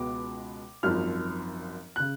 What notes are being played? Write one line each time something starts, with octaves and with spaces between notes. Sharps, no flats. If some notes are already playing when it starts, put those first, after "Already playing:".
Already playing: C#2 B2 G#3 B3 D6
G#1 F#2 F3 F6
C#3 F#6